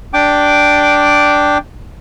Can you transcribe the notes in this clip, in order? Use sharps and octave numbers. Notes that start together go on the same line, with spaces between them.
D4 G5 D6